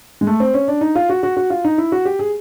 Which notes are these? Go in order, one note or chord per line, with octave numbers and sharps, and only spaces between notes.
G#3
A3
C4
C#4
D4
D#4
F4
F#4
F#4
F#4
F4
D#4
E4
F#4
G4
G#4